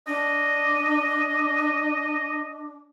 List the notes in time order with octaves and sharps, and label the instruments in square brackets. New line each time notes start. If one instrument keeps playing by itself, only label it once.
[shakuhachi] D4 [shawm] D#5